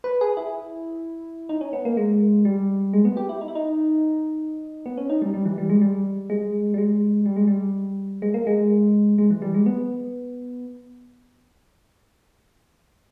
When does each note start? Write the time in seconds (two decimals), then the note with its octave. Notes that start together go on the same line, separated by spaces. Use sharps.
0.04 B4
0.21 G#4
0.37 E4
1.49 D#4
1.61 C#4
1.73 B3
1.85 A#3
1.97 G#3
2.45 G3
2.93 G#3
3.05 B3
3.17 G4
3.29 E4
3.41 D#4
3.48 E4
3.55 D#4
4.86 B3
4.98 C#4
5.10 D#4
5.22 G3
5.34 G3
5.45 E3
5.58 G3
5.70 G#3
5.82 G3
6.30 G#3
6.74 G3
6.78 G#3
7.26 G3
7.36 G#3
7.47 G3
8.22 G#3
8.34 A#3
8.47 G#3
9.18 G#3
9.30 E3
9.42 G3
9.54 G#3
9.66 B3